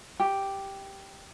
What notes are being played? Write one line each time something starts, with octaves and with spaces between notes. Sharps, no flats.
G4